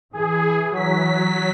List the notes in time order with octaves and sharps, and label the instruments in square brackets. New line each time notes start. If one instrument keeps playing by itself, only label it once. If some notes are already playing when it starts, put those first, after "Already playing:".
[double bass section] E3 [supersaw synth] G#4
[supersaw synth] F#3 B6